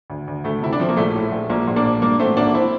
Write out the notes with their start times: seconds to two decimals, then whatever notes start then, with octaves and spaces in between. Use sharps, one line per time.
0.10 D2
0.28 D2
0.44 D2 A3
0.62 C3 E4
0.73 D4
0.80 F3 C4
0.89 A#3
0.97 A#1 A3
1.14 A2
1.32 A#1
1.50 A#1 A#3
1.68 A#1
1.76 A#3 D4
1.85 A#1
2.02 G2 A#3 D4
2.19 A1 A3 C4
2.37 A1 A#3 D4
2.55 C4 E4